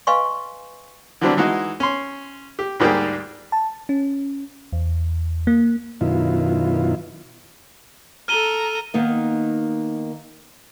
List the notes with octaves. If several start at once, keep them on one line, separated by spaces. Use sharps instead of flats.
B4 D#5 F5 G#5 C6 C#6
D3 E3 F#3 G3 C4 D4
E3 G#3 D#4 F#4
C#4 C6
G4
D2 G#2 G3 A#3 G#4 G5
A5
C#4
E2
A#3
F#2 B2 D#3 E4 F4
A4 A#5 F6 D#7 G7
D#3 A#3 B3 D#4